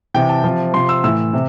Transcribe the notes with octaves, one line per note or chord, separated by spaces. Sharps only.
C3 E3 G5
A5
C3 F3
C3 F3 C6
E6
A2 E3 E6
C3